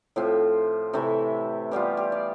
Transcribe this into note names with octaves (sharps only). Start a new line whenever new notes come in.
A2 F3 C4 F4 E5
C3 E3 A3 E4 E5
E3 G3 B3 F4 G4
G4
D5